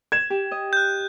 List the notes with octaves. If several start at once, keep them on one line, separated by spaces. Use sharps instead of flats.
G#6 E7
G4
D#5
F#6 G6